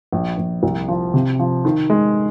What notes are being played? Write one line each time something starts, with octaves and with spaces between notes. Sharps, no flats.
A#1
A#1
C2
F3
C3
F3
D#3
G#3